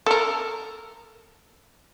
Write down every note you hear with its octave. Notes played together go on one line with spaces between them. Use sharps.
A4 A#4